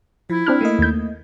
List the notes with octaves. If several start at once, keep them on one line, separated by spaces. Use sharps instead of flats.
F3 E4
C4 D4 F6 F#6
A3 A#3 D#5
D#2 G6